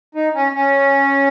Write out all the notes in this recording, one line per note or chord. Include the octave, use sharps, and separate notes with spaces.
D#4
C#4
C#4